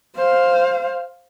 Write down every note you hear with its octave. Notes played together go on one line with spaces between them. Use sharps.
C5 F5